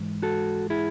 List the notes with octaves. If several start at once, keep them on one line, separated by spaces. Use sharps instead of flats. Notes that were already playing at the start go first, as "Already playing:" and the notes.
Already playing: G#2 E3 G#3
F#4 A4
E4 G#4